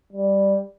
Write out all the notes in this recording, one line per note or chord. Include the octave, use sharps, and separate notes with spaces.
G3